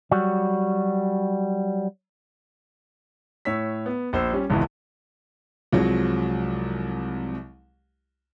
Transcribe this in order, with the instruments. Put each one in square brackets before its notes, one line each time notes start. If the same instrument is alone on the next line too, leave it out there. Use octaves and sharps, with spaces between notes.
[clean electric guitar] F#3 G3 F#4
[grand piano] A2 C#5 E6 B6
B3
A#1 C5 E6
G3 C#4
G#1 C#2 B2 E3
C2 F3 F#3 G#3